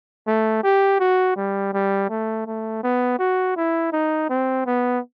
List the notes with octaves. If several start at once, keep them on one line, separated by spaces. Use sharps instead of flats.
A3
G4
F#4
G3
G3
A3
A3
B3
F#4
E4
D#4
C4
B3